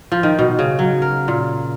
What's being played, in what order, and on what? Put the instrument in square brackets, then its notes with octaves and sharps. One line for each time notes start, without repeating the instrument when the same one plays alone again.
[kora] F3
D#3
B2
C#3
F#3
A#4
A#2